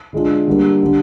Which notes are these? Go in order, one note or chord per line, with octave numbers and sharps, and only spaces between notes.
D3 G#3 D4 F4
D3 G3 A#3
D3 G3